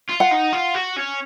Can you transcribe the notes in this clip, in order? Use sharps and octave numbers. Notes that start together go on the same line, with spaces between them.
F4
F#5
D#4
F4
F#4
C#4